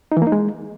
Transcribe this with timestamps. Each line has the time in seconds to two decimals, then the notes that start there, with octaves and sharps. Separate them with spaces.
0.12 D#4
0.17 E3
0.22 A#3
0.27 D#4
0.32 G#3